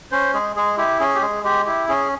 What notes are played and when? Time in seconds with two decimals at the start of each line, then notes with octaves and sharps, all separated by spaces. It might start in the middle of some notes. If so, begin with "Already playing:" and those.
0.12 C#4 C5
0.34 G#3 G#4
0.56 G#3 G#4
0.78 E4 G4
1.00 C#4 G#4
1.15 G4
1.22 G#3 G#4
1.44 G#3 G4
1.66 E4 G4
1.88 C#4 G#4